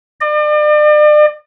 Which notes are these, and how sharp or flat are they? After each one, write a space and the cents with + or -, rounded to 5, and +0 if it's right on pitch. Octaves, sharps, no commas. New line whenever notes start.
D5 +40